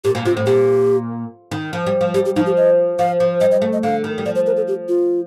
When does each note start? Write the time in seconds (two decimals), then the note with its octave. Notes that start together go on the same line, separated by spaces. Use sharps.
0.04 A#2 G4
0.15 A#2
0.25 C3 F4
0.37 A2
0.46 A#2 G4
1.51 D#3
1.73 F3
1.86 G3
2.01 F3
2.14 G3 G4
2.25 G4
2.36 F3 D#4
2.46 G4
2.57 D#5
2.99 F3 F5
3.20 F3
3.41 G3 D#5
3.52 D#5
3.62 A3
3.73 D#5
3.83 D3 F5
4.04 D#3
4.18 G3
4.26 F3 D5
4.35 C5
4.46 A#4
4.57 A4
4.68 G4
4.88 F4